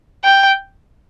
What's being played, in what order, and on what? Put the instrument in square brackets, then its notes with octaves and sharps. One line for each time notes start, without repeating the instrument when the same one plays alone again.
[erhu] G5